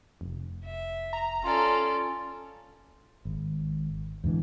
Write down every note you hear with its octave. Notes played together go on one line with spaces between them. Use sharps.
F1
E5
A#5
C#4 F4 A4 D5
G#1
E2 G#2 D3 E3